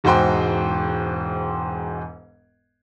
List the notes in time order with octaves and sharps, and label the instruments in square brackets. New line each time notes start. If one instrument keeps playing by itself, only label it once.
[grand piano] E1 G#2 F#4 C5 G5 C6